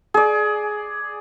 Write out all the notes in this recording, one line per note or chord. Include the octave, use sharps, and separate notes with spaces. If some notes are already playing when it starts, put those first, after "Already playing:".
G#4 D5